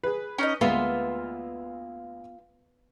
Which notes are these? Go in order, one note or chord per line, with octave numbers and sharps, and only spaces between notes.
G#4 B4
C#4 D#4 D#5
D2 G#3 A#3 B3 F4 E5 C6